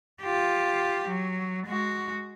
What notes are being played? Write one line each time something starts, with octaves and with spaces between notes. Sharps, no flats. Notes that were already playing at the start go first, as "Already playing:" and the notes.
F4 G4
F#3
G#3 F#4